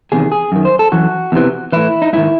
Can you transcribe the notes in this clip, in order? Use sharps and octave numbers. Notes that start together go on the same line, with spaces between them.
E2 C3 D#3 G#4
G#4
F#2 D#3
C5
A4
F#2 E3 F#4
E2 C3 E3
A2 E3 E4
D#4
G#2 D#3 E4